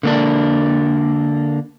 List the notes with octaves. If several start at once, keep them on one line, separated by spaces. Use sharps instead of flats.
D3 A#3 D4